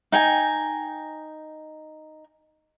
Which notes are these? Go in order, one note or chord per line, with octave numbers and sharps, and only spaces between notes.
D#4 G5 G#5